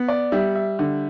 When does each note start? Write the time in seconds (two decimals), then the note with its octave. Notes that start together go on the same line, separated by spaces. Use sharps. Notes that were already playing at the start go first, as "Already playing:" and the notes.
Already playing: B3
0.08 D5
0.32 G3 E5
0.55 E5
0.79 D3